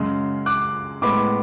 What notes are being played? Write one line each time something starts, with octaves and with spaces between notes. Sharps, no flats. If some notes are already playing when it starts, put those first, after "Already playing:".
Already playing: F#2 C#3 G#3
D6 F#6
A2 G#3 B3 B5 D6